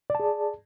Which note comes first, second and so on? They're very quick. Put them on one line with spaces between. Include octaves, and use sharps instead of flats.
D5 A5 G#4